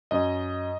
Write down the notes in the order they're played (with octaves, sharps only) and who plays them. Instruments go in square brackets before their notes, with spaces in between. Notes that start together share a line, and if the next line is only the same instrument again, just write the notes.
[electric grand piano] F#2 D#5